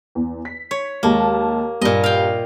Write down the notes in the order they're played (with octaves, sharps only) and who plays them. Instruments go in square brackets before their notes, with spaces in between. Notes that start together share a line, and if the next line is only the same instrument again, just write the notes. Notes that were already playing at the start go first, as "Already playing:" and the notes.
[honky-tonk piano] E2
B6
[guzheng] C#5
[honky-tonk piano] D#2 G#3 A5 [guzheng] A#3
[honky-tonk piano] G2 [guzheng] A#2 D#5
[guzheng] F5 G5